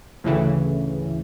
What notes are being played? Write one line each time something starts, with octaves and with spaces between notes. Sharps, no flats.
D2 A2 C#3 E3